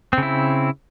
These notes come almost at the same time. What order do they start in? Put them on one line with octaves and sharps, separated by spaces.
C4 C#3 E4